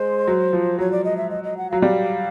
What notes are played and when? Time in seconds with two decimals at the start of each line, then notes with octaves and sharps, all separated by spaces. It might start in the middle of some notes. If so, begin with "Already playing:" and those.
Already playing: G#3 C5
0.28 F#3
0.53 F3
0.79 F#3 C#5
0.92 D5
1.04 D#5
1.17 E5
1.30 D#5
1.44 D#5
1.57 F#5
1.70 F#3 F5
1.82 G3 F5